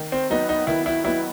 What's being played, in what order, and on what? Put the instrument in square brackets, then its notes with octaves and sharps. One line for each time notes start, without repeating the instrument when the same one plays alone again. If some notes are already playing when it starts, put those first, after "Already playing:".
Already playing: [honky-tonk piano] D#3
[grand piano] C4
[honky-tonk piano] F#3 B3 [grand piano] D#4
[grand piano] D#4
[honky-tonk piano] D#3 [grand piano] E4
[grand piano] E4
[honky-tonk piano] F#3 B3 [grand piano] E4